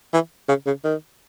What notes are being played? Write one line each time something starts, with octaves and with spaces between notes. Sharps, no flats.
E3
C#3
C#3
D#3